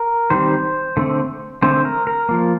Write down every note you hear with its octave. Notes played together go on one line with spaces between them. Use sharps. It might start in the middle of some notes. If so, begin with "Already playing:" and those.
Already playing: A#4
D#3 G3 C4 C5
D3 A3 C4
D3 A3 C4 C5
A#4
A#4
F3 A#3